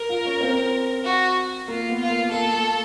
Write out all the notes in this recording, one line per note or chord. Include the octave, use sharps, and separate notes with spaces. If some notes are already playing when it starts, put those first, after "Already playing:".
Already playing: A#4
F4
C#4
C4
F#4
A#3 F4
B3
F4
A#3
A#3 A4
A3